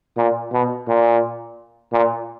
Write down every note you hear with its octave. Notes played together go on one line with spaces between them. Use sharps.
A#2
B2
A#2
A#2